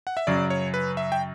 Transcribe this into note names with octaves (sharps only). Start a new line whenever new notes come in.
F#5
E5
F#2 C#3 F#3 D5
C#5
B4
E5
G5